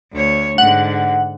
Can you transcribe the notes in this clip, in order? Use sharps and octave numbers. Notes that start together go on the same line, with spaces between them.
D2 C#5
G#2 D3 F#5